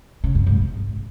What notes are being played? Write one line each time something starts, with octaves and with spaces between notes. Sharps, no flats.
C#3
F#2
G#2
B2